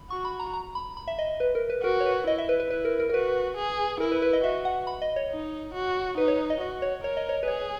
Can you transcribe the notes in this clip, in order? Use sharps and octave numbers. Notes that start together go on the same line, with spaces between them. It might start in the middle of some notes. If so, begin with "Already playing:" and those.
Already playing: B5
F#4 C#6
B5
A#5
A#5
B5
B5
E5
D#5
B4
A#4
B4
F#4 A#4
C#5
B4
E4 D#5
E5
B4
B4
E4 B4
A#4
A#4
A#4
F#4 B4
G#4
E4 A#4
B4
B4
D#5
F#4 E5
F#5
B5
D#5
C#5
D#4
F#4
D#4 B4
C#5
D#5
F#4 D#5
C#5
A#4 C#5
D#5
C#5
B4
G#4 C#5